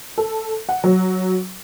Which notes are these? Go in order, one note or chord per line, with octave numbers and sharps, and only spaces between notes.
A4
F#5
F#3